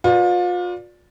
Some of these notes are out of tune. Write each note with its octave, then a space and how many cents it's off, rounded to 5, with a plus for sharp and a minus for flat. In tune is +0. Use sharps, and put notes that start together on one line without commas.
F4 +35 B4 -5 D5 +0